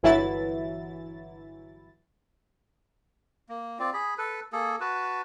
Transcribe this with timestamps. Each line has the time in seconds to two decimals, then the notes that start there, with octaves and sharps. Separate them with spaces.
0.03 G1 E3 F#3 E4 A6
3.49 A#3
3.79 C4 F4 D5
3.94 G#4 B5
4.18 A4 B4
4.53 A#3 G#4 A4
4.80 F#4 B4 A5